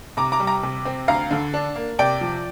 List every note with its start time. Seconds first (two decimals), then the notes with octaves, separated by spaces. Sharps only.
0.17 C3 A#5 D6
0.32 A#5 D6
0.40 G3
0.47 A#5 D6
0.63 C3
0.85 C4
1.08 D2 F5 A#5
1.31 D3
1.54 D4
1.76 A#3
1.99 C3 D5 G5
2.21 F3